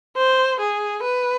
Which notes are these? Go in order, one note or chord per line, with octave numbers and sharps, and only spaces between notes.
C5
G#4
B4